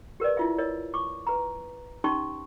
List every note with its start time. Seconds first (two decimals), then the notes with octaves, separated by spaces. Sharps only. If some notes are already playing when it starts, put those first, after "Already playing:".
0.20 G4 A#4 B4 D5
0.37 E4 F4 E5
0.58 A#4 C#5 D#5
0.94 C#6 D6
1.27 B4 A#5
2.04 C#4 D#4 G4 A5 C6 C#6